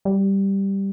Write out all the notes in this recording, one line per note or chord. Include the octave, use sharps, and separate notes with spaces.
G3